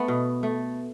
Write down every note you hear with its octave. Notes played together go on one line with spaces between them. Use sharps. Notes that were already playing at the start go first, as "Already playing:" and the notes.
Already playing: A3 B3
B2
A3